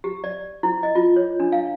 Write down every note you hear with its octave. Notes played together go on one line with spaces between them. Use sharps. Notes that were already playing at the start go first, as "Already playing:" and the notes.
G4
D5
E4
D#5
F4
C#5
D4
F5